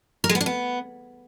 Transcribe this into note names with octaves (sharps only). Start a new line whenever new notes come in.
A#4
G#3
B3
D4
B3